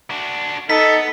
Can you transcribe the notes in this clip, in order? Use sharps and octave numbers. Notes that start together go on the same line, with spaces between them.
D4 F#4
B3 D#4 A4 B6